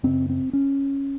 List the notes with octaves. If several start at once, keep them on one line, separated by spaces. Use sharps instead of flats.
F#2 C#3 C4
C4
C#4